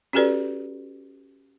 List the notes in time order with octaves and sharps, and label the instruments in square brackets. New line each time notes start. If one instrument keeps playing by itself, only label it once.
[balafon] C#4 F#4 G4 A4 B4 D5